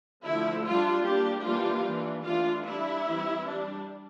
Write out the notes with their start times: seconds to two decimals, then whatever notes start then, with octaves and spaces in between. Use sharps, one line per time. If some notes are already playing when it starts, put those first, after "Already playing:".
0.25 D3 F3 A3 E4
0.65 G3 D4 F4
1.05 G3 A#3 D4 G4
1.45 E3 G3 A#3 D4 F4
1.85 E3 A#3 D4
2.25 E3 A3 D4 F4
2.65 G3 D4 E4
3.06 E3 G3 C4
3.45 G3 D4